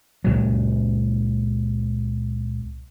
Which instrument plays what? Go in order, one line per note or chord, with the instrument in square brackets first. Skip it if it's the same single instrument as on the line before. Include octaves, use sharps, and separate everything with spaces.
[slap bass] C#2 A#2 F#3